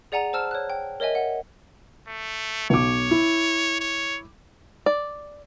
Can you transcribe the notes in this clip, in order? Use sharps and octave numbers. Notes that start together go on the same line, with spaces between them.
G#4 D5 F#5 G#5 A#5 F7
C5 A5 E6 F6 E7
C#5 F#6
G5
A#4 C#5 D#5 E5 G#5
F#5
A3
B1 C#5 D6
E4
C#5
D5